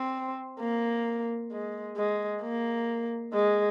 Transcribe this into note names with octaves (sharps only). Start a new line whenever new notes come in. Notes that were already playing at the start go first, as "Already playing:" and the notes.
Already playing: C4
A#3
G#3
G#3
A#3
G#3